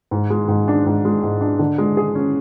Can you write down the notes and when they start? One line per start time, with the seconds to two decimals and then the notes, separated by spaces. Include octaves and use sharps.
0.11 G#2
0.30 G#3
0.48 G#2
0.68 D4
0.86 G#2
1.05 G#3
1.23 G#2
1.41 D4
1.59 D3
1.78 G#3
1.97 G#4
2.15 C#4